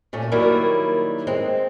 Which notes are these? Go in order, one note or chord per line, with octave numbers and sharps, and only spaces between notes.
A#2 A3 C#4
D#3 F#3 G3 A#3 E4 A#4
G#3 C4